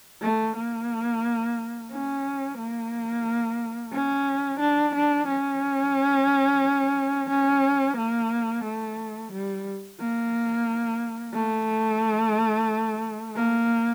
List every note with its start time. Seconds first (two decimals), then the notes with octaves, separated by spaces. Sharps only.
0.22 A3
0.57 A#3
1.92 C#4
2.58 A#3
3.93 C#4
4.60 D4
4.95 D4
5.28 C#4
7.30 C#4
7.97 A#3
8.64 A3
9.32 G3
10.00 A#3
11.34 A3
13.36 A#3